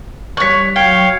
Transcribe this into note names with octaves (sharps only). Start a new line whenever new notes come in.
G3 C#5 C#6 F#6 B6
F#3 C#5 F5 G5